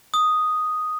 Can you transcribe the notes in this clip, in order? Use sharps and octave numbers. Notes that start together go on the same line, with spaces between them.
D#6